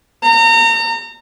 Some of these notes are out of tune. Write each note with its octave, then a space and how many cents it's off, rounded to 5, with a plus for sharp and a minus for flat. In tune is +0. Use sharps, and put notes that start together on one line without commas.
A#5 -35